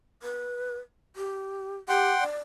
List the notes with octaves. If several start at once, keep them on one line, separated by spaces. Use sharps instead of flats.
B4
G4
G4 F#5 G5 C6
D5